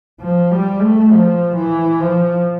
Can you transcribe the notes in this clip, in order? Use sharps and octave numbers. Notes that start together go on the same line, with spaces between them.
F3
G3
A3
F3
E3
F3